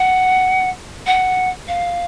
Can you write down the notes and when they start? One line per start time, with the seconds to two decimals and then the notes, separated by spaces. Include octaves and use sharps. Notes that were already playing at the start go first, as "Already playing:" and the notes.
Already playing: F#5
1.06 F#5
1.67 F5